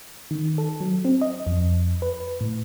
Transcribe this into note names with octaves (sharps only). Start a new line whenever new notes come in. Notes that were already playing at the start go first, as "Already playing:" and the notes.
D#3
A4
F#3
C4
D#5
F2
B4
A2